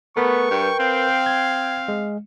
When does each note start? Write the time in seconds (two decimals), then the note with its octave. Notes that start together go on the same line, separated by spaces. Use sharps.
0.17 A3 B3 A#4 B4 C#6
0.51 G2 G5
0.80 C4 F5
1.26 G#6
1.88 G#3